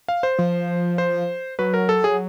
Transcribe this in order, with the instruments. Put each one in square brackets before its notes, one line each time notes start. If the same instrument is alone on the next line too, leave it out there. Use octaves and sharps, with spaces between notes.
[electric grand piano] F5
C5
[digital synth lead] F3
[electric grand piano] C5
[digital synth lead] F#3 [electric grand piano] B4
[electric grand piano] A#4
A4
G#4